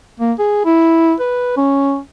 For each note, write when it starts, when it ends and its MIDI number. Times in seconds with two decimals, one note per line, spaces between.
0.20 0.33 58
0.39 0.65 68
0.65 1.14 64
1.20 1.57 71
1.57 1.99 61